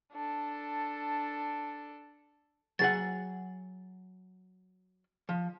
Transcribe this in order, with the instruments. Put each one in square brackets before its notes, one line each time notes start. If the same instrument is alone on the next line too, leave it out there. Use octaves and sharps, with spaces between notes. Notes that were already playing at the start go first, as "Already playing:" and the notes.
[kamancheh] D4 A4
[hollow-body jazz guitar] F#3 G#4 F#5 [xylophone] A6
[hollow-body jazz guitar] F3